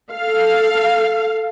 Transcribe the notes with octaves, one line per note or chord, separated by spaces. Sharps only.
A4 F5